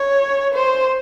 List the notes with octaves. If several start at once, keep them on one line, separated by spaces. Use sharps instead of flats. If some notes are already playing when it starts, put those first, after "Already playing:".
Already playing: C#5
C5